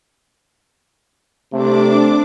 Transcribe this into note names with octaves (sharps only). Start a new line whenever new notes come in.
C3 A3 D4 D6